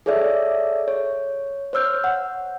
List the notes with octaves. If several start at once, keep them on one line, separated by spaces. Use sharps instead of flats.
G#4 A4 C#5 D5 E5
C#5
C5 C#5 E6 F6 G6
F#5